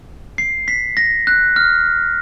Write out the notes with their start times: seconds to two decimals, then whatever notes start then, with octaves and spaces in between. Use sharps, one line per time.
0.38 C7
0.68 B6
0.97 A#6
1.27 F#6
1.56 F6